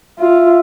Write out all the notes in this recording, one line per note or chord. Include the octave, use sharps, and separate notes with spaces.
F4 E5